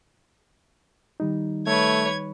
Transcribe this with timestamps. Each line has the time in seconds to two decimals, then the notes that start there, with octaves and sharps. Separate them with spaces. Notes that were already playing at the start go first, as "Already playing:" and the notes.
1.20 D#3 G3 D#4
1.67 A3 B4 C#5 G#6